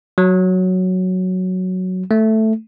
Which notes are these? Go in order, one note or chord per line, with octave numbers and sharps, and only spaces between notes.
F#3
A3